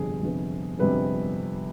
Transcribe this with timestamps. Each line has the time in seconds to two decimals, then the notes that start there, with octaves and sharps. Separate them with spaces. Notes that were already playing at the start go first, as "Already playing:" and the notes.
Already playing: G1 F2 C3 G3 B3 G#4
0.22 G1 F2 C3 G3 B3
0.79 G1 F2 C3 G3 B3 B4